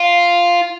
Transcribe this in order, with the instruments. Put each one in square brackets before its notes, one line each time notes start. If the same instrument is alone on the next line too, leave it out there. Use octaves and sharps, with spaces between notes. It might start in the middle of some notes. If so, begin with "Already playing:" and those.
Already playing: [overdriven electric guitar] F4